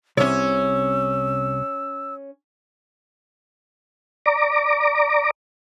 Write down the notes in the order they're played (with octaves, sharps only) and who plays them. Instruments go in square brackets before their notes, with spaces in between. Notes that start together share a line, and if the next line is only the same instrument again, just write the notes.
[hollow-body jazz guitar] C2 C3 [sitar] C#4 C#5 [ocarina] E6
[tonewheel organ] D5 A#5 D6